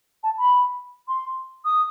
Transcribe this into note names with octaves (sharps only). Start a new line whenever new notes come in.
A5
B5
C6
D#6